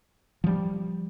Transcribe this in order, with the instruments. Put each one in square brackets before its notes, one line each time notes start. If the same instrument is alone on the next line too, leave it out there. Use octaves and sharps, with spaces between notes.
[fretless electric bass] F3 G3